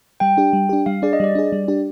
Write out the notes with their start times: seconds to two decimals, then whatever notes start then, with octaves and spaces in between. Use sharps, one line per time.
0.20 G3 G5
0.37 D4 G4
0.53 G3
0.69 D4 G4
0.86 G3 F5
1.02 D4 G#4 D5
1.13 D#5
1.20 G3 D5
1.35 D4 G#4
1.52 G3
1.68 D4 G4